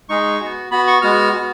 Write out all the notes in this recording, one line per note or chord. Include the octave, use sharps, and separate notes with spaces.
G#3 D#4 G#4 C#6
F#4
B3
B3 F#4 B5
C#6
G#3 B3 F#4 F6
B3 F#4